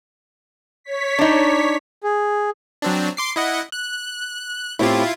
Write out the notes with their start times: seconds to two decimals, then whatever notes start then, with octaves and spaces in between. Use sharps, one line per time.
0.84 C#5 B6
1.19 D4 D#4
2.04 G#4
2.82 F#3 C4 D4
3.17 C6 D6 C7
3.36 E4 D#5 F#5
3.72 F#6
4.79 A2 C4 E4 F4 G4